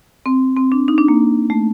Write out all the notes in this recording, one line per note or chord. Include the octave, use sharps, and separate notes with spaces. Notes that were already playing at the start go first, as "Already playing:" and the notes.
C4
C4
D4
D#4
D4
A#3
A3